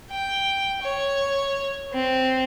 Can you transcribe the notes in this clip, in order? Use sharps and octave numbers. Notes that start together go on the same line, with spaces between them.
G5
C#5
C4